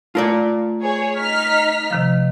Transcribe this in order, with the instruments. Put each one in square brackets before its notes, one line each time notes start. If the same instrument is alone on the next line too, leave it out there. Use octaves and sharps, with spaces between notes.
[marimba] A3 [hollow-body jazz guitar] F4 A#4 D5
[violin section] G#4 C#5
D#4 F6 B6
[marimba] C3 D#3 F3